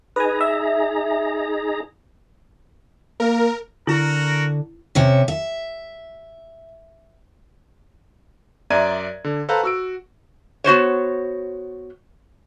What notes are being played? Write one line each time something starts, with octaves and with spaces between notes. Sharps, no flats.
D#4 G#4 B4 G#5 A#5
E5
A#3 A#4
D3 E4 F#4 A#4
C3 C#4 C#5 E5
E5
F#2 D5 E5 A#5 G#6 D#7
D3
A4 B4 C5 F5 F#5 A#5
F#4 E6 D7
B3 F#4 C5 C#5